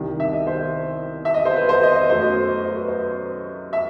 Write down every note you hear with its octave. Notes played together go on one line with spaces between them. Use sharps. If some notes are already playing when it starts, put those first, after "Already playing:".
Already playing: C2 C3 D#3
E5
D#5
C5
E5
D#5
C5
B4
C5
D#5
D#5
F#2 F#3 A3 C5
D#5
C5
B4
C5
E5